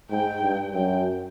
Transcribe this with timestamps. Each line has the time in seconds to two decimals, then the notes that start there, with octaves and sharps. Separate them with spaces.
0.11 G#2 G5
0.42 G2
0.73 F#2 G5